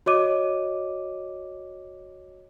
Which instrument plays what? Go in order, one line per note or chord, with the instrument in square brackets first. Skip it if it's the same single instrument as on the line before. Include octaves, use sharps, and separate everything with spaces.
[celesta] F#4 C#5 D#5 D6 D#7